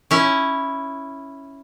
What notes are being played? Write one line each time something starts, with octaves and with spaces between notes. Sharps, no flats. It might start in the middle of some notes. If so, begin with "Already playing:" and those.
C#4 E4